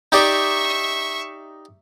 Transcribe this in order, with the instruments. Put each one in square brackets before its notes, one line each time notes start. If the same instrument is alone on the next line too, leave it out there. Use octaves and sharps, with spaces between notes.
[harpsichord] D#4 G4 D5 [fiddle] E5 C#6